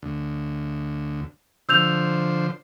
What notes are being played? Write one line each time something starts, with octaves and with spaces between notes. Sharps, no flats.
D2
D3 F3 C5 E6 G6 F7